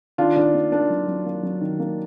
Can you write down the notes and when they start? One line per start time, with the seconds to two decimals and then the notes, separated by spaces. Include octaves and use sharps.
0.18 D#3 D4 F4
0.36 D#3 D4
0.54 A#3
0.72 A#3 D4
0.90 F#3
1.08 F#3
1.26 A#3
1.43 F#3
1.61 D#3
1.79 A#3